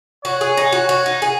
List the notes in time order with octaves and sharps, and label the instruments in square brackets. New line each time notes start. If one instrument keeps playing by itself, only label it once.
[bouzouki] F#4 [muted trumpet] C#5
[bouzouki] G#4
D#4
F#4
F#4
D#4
G#4